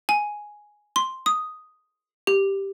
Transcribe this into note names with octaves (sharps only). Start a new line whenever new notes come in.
G#5
C6
D#6
G4